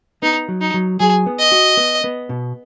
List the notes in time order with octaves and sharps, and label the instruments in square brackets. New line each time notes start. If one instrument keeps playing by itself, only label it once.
[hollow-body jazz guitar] B3 [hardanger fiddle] D#4
[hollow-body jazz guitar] F#3
[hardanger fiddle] D#4
[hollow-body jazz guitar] F#3
[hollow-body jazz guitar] F#3 [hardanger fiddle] G#4
[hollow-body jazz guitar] B3
[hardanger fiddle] D#5
[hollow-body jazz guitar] F#4
B3
B3
B2